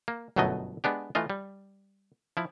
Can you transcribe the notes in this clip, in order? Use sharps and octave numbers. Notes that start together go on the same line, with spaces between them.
A#3
G1 F#2 B2 F#3 A3 D#5
G#3 B3 D4 G4
E3 A3 F4 D#5
G3
F3 E4